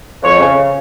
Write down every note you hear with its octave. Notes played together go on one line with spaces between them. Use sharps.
F2 C#5
C#3